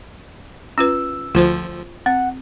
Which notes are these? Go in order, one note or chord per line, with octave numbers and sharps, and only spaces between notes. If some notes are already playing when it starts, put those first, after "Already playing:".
C#4 F4 B4 E6
D2 F3 F4 C5
C4 F#5